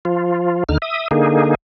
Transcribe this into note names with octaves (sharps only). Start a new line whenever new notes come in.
F3 F4
D#2 D3 D#4 F6
E5 D#6
D3 A#3 D#4 G#4